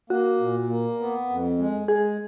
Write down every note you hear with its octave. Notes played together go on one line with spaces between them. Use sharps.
A#3 F#4
A#2
A#3
B3
F2
G#3
G#3 G#4